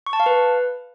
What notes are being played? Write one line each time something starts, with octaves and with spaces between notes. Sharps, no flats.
C#6
A5
F5
B4